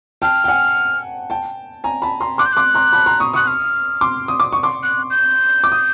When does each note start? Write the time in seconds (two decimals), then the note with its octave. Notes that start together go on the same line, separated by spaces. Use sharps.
0.22 G5 A5 F6
0.44 G5
0.48 F#5 G#5
1.30 G5 A5
1.84 G#5 A#5
2.02 A5 B5
2.20 A#5 C6
2.38 C6 D6 F#6
2.46 G6
2.53 C6 D6 F#6
2.75 A#5 C6
2.93 A5 B5
3.06 A#5 C6
3.20 C#6 D#6
3.33 C#6 D#6 F#6
3.47 F6
4.01 C6 D6
4.28 D#6
4.40 D6
4.52 C#6
4.63 C6 D6
4.83 F#6
5.10 G6
5.64 D6
5.72 D#6